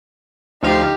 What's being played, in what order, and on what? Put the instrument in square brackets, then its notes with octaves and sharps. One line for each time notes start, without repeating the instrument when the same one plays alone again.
[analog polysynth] D2 F3 F5 [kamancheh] D#4 G4